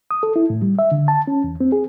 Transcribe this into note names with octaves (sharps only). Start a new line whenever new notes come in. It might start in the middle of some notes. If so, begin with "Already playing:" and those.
D#6
A4
E4
A2
G3
E5
D3
A5
C#4
E2
C4
G#4